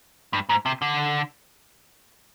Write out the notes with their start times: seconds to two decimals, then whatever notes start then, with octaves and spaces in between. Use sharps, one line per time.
0.33 G2
0.49 G#2
0.66 C3
0.82 D3